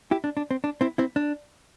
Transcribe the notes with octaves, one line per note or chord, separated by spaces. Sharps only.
E4 G4
D4
D4
C4
D4
C4 E4
C4 E4
D4